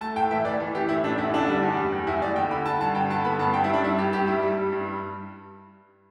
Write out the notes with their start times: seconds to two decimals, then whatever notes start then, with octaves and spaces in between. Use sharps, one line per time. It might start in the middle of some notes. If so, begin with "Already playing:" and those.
0.01 A3 A5
0.16 A2 G5
0.31 E3 E5
0.45 E3 D5
0.60 E3
0.74 E3 G4
0.89 A2 E4
1.04 A2 D4
1.18 E2 E4
1.34 D3 D4
1.48 G3
1.63 E2
1.77 G3
1.92 E2
2.07 E2 E4
2.22 E2 D5
2.36 D3 G5
2.51 D3 B5
2.65 D3 A5
2.80 G2 A5
2.95 G2 G5
3.10 D3 A5
3.25 B3 B5
3.39 G2 A5
3.54 G2 G5
3.64 E4
3.68 G3
3.74 D4
3.83 G2 E4
3.98 G2 G4
4.13 G2 G4
4.27 G3 E4
4.43 G3
4.58 G3
4.72 G2